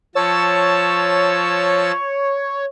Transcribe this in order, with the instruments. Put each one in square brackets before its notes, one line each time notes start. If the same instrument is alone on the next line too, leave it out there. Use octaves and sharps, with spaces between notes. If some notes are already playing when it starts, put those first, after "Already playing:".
[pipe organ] F3 A5 E6 [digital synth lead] C#5